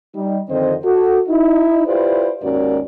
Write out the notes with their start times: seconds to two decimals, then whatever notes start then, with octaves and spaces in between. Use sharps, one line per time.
0.15 G3 D#4
0.49 F2 D3 D#3 C4 C5 D#5
0.84 F#4 A4
1.29 D#4 E4
1.86 E4 F4 G4 B4 C5 D5
2.42 D#2 G#2 C#4 F#4 A#4 D5